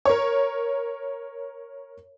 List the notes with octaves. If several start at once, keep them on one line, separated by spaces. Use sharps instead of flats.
A#4 C#5